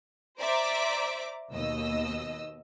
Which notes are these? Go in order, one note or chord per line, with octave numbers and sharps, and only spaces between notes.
C5 D5 E5 A#5 D6
D#2 B2 D#5 E6